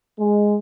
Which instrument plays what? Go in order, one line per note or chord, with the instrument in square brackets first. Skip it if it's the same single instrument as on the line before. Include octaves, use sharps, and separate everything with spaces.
[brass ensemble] G#3